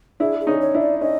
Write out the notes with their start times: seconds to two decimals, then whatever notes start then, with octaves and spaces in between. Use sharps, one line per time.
0.20 D4 E4 G#4
0.41 G#4
0.47 C#4 D#4
0.61 C#5
0.74 D4 E4
0.81 D5
1.01 C#4 D#4 D#5